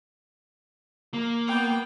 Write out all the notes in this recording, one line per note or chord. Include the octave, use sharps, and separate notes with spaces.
A#3
B3 G5